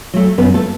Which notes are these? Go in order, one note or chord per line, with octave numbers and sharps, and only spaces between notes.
F#3 A3
F#2 B3 B4
A3 A4